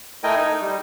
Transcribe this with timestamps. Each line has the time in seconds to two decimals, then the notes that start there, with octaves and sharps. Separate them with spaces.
0.24 A3 E4 A#4 D#5 G5 G#5
0.36 D#4
0.61 G3